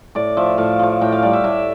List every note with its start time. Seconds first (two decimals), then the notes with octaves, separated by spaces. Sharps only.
0.15 A2 D5
0.37 F3 A3 E5
0.58 A2 F5
0.79 F3 A3
1.01 A2 G5
1.12 F5
1.22 G3 D5
1.33 E5
1.44 A2 E5